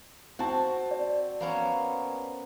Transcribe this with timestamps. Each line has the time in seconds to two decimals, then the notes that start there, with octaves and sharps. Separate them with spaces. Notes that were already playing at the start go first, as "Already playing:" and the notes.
0.39 C4 F#4 A5
0.91 D5
1.40 A#3 B3 C#4